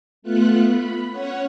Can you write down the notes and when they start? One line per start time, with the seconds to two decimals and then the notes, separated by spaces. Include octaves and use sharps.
0.22 A3 B3 F4 F#6
0.67 B5
1.10 C#4 C#5 F#5